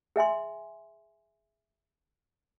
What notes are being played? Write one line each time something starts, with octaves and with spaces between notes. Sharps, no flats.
G#4 E5 G#5 C6